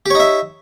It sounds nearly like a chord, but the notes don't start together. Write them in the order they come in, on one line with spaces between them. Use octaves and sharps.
G4 C#5 D#4 E5